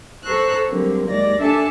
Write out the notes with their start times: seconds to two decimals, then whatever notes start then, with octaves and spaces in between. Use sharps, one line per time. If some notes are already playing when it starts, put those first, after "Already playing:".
0.24 A4 C5 A#5 C#6 E6 F#6
0.69 D3 F#3 G3 A#3 C4
1.08 D#2 G#3 D5 A#6
1.39 D4 A4 E5 G#5 A5